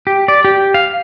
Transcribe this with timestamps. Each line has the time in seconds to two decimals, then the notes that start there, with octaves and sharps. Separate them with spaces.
0.07 G4
0.28 D5
0.45 G4
0.74 F5